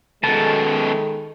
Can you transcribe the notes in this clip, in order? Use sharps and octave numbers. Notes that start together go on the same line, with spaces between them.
F#2 B2 D#3 G#3 A4 A5